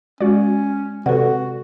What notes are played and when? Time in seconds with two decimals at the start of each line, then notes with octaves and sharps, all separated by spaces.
0.21 G#3 C#4 F#4 D5
1.06 C3 F#4 A4 B4 D5 F#5